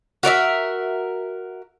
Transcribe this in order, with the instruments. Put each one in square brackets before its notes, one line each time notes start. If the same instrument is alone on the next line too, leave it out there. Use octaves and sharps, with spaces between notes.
[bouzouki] F#4 A#4 D5 E5